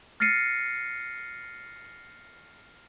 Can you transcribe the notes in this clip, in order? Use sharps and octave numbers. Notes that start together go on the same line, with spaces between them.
F6 A6 A#6 C7 C#7 D#7